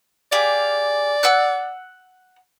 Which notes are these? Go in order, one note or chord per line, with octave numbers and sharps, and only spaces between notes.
G4 G#4 D5 F5
F#5 E6 F#6